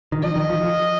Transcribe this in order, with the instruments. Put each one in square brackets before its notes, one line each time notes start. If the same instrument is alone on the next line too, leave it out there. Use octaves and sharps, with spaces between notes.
[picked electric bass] D#3
[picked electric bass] F3 [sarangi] D#5
[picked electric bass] D#3
F3
F3